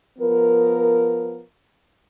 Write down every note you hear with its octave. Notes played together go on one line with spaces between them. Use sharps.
F3 B3 A#4